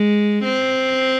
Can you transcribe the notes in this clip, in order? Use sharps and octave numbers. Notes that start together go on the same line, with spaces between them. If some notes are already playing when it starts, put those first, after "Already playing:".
Already playing: G#3
C4